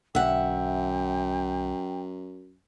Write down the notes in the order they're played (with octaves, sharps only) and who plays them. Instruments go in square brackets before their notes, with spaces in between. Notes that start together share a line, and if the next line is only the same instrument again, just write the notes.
[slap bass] B1 D3 [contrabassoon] F#2 [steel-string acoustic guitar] E5 F#5 [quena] G5